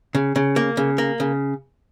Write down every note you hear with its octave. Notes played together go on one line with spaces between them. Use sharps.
C#3
C#3
A#3
C#3
A#3
C#3